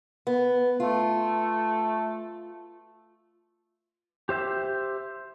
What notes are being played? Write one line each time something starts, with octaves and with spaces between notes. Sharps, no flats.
B3
A3 F4
G4 C5 E5 G6